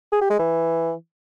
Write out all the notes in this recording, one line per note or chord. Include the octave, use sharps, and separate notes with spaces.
G#4
G4
G#3
E3